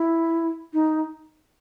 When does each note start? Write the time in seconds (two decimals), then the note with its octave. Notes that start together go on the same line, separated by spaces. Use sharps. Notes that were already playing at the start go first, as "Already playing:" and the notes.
Already playing: E4
0.73 D#4